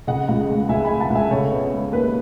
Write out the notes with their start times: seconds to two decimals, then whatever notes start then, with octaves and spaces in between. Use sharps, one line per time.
0.07 C#3 D#5 F#5
0.29 C#2
0.49 G#3
0.69 C#2 E5 G#5
0.85 G#5 B5
0.90 C#3
1.00 F#5 A5
1.10 C#2
1.15 E5 G#5
1.31 C#3 A4 C#5
1.52 B3
1.72 G#3
1.92 D#2 B4